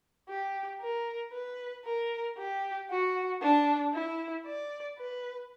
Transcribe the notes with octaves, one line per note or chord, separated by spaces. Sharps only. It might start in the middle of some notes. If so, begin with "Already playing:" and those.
G4
A#4
B4
A#4
G4
F#4
D4
E4
D5
B4